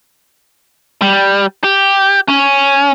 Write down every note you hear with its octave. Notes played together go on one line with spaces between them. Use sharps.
G3
G4
C#4